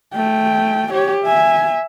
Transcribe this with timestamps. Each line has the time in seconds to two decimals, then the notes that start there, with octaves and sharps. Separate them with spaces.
0.14 A3 G5
0.91 G4 C#5
1.25 E5 G#5